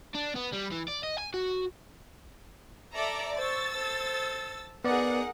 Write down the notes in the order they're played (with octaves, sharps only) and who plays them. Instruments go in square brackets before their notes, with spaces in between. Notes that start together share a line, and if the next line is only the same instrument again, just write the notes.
[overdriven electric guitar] D4
B3
G3
E3
D5
D#5
G#5
F#4
[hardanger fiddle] A4 [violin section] D5 E5 A#5
[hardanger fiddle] C5 C#6 [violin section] E6 A6
[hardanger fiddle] A4 C5
[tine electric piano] B3 D5 [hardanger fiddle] D#4 G#4 [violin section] A#4 F#5